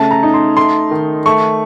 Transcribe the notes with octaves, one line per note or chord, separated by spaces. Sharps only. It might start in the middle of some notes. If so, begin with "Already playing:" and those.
Already playing: C#3 A3 A5
A#5
D#4
C6
A3 C6
D#3
A3 C#6